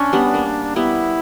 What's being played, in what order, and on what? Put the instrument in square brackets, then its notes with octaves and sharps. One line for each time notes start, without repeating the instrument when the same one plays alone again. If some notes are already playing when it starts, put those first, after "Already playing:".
Already playing: [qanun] C#4 [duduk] D4
[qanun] G3 B3
A#3
[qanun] G3 B3 [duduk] E4